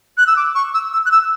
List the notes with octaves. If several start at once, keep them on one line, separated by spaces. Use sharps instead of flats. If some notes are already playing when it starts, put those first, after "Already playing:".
F#6
E6
D6
C#6
E6
E6
F#6
E6